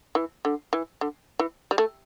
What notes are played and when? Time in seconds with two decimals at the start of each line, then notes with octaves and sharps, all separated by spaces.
0.15 E3
0.45 D3
0.73 E3
1.01 D3
1.39 E3
1.71 G3
1.78 A3